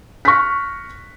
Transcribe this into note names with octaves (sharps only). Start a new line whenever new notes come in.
C#6 F6 F#6 A#6 B6